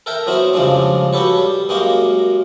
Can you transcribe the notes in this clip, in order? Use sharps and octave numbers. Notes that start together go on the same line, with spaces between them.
A4 A#4 E5 G5
F#3 B3 C4 E4 F#4
F2 C#3 F3 G3 G#3 D4
F#4 G4 A4 B4 C#5
G3
F#2 G#3 A#3 F#4 G4